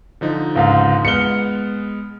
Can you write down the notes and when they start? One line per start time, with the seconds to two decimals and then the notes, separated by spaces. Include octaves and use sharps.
0.21 D3 F3 D#4
0.56 C#2 G#2 F5
1.05 G#3 B3 F6 C#7 G7